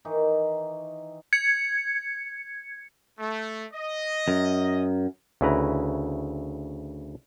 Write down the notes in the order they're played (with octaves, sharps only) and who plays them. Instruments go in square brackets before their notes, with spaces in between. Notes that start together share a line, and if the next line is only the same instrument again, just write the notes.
[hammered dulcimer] D#3 E3 D#4
[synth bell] G#6 C#7
[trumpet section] A3
D#5
[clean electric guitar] F#2
[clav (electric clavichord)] D2 C#3 E4 B4 A#5